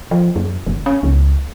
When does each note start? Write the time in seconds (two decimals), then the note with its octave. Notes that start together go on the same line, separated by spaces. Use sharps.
0.11 F3
0.36 F#2
0.66 G1
0.86 C#4
1.03 C#2